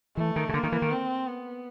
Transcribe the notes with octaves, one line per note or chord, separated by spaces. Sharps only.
E3 A3
D#3
C#3
D3 A#3
D#3
E3
D#3
C4
B3